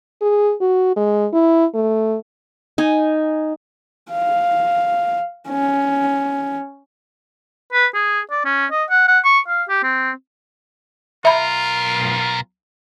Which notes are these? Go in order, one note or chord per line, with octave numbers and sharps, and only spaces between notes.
G#4
F#4
G#3
E4
A3
D#4 G#5
F5
C#4
B4
G#4
D5
C#4
D#5
F#5
F#5
C#6
F5
G4
C4
B1 F4 A#4 E5 B5